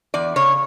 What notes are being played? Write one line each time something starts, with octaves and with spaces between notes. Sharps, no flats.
E2 D5
C#3 C#5